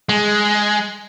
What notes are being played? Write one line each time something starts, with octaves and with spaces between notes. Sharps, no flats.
G#3